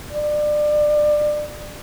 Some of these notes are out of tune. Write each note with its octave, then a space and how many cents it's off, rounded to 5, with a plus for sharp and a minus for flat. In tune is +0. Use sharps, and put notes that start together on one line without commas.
D5 +25